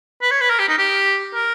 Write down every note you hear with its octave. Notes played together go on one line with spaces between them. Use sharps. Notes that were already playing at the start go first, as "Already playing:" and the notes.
B4
C#5
B4
A#4
G4
D#4
G4
A#4